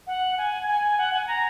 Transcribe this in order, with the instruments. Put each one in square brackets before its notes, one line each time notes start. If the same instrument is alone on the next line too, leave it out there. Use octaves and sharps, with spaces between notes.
[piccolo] F#5
G#5
G#5
F#5
G#5
A#5